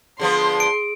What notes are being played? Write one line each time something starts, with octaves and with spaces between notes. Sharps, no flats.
D3 F3 B3 G#4 C6
D7